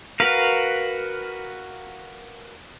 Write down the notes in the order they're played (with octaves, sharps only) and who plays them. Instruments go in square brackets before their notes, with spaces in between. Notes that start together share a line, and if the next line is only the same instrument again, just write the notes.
[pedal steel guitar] F#4 A#4 B4 F5